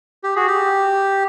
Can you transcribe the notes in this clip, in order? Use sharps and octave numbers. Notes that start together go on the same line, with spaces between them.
G4
F#4 G#4
G4